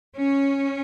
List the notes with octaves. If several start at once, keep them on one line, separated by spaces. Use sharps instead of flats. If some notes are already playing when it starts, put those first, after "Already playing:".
C#4